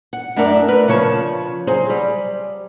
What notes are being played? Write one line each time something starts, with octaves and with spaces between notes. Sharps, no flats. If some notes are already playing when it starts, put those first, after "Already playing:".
F#5
F#2 A3 D4 E4 A#4 D5
A#4 B4
C#3 F3 C#5 A5
F#3 G#4 C5
G3